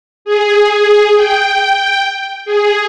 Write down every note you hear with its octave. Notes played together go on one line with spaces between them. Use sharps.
G#4
G5
G#4